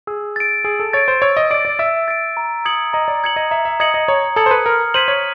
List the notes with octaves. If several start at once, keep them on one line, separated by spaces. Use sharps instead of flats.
G#4 E6
A6 D7
G#4 E6
A4
C#5 A6 D7
C5
C#5 E6
D#5
D5 A6 D7
D5
E5 E6
A6 D7
A#5
D#6 G#6 C#7 F#7
D#5 A#5
D5
D#6 G#6 C#7 F#7
D#5
E5 A#5
E5
D#5 D#6 G#6 C#7 F#7
D#5
C#5 A#5
A4 D#6 G#6 C#7 F#7
C5
B4
A#4 F6
C5 G#6 B6 D#7 F#7
C#5